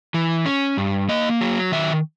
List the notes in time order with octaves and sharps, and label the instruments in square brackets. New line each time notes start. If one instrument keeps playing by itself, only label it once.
[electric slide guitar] E3
C#4
G2
A#3 D#5
F#3
D#3 E5